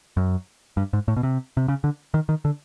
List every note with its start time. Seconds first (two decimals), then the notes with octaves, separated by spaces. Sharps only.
0.17 F#2
0.77 G2
0.93 G#2
1.08 A2
1.17 B2
1.23 C3
1.57 C3
1.68 C#3
1.84 D3
2.14 D#3
2.29 D#3
2.45 D3